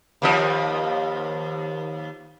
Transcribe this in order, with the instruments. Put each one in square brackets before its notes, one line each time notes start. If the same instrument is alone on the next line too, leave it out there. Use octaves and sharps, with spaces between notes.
[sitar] D#2 F3 D#5